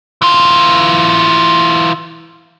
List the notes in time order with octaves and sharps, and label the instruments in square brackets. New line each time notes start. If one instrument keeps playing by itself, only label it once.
[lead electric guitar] E3 F4